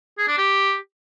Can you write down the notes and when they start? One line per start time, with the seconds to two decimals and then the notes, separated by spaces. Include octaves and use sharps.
0.18 G#4
0.28 D4
0.38 G4